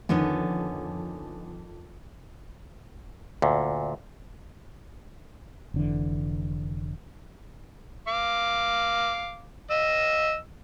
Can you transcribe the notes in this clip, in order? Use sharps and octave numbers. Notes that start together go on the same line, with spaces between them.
F2 D3 D#3 B3 C#4
D2 A#2
F1 D3 E3
F5 D6
D#5 E6